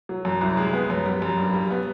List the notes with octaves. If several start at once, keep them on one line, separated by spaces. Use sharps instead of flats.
F#3
F#2
C2
G#3
B3
F#2
G3
F#2
G2
G3
B3